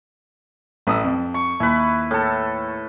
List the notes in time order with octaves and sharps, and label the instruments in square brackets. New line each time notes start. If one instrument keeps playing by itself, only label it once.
[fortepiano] A1 D#6 E6
F2
[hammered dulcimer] C#6
[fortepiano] D#2 [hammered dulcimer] E4 B4
[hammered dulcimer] A2 A4